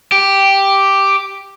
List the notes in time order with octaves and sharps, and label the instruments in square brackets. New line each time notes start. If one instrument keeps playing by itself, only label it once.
[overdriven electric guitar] G4